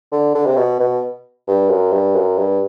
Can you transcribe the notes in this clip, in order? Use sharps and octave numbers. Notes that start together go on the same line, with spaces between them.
D3
D3
C3
B2
B2
G2
F#2
G2
F#2
G2